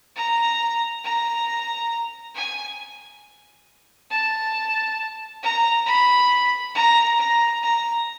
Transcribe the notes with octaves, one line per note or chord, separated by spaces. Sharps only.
A#5
A#5
G#5
A5
A#5
B5
A#5
A#5
A#5